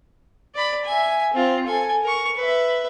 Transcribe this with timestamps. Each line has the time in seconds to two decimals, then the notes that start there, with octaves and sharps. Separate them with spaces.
0.55 D5 B5
0.85 E5 G#5
1.33 C4 F4
1.67 A4 G#5
2.03 A#4 C#6
2.36 B4 E5